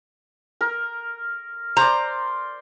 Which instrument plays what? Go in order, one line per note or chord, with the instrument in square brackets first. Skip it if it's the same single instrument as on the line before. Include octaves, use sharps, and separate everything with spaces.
[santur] A#4
[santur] C5 D5 [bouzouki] A#5